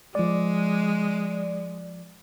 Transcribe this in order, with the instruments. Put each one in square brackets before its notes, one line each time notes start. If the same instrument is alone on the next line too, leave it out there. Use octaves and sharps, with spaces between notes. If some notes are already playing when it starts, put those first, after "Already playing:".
[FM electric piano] F3 D5 [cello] G#3